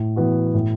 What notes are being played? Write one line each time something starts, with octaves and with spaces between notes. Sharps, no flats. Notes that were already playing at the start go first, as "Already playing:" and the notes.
Already playing: A2
E3 B3 F#4
A2